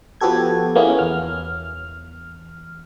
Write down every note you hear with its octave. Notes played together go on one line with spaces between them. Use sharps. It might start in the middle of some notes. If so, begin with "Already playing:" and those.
F3 B3 F#4 G4 A4 G#6
A#3 B3 C#4 E4 G#4
E2 F6